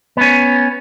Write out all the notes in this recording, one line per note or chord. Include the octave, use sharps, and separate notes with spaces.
B3 C#4